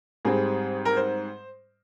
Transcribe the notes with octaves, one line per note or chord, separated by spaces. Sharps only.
G#2 G3 C4 G#4
A#4
C5